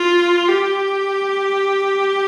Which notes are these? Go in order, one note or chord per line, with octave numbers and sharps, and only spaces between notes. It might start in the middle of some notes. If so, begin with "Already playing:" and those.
Already playing: F4
G4